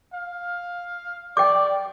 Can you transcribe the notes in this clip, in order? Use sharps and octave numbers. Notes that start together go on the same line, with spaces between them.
F5
D5 G5 D6